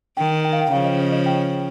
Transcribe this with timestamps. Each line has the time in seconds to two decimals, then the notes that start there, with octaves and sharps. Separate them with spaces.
0.17 D#3 G5
0.45 G5
0.53 F5
0.61 G5
0.72 C#3 F3 F5
0.85 D#5
0.99 C#5
1.12 D#5
1.26 G5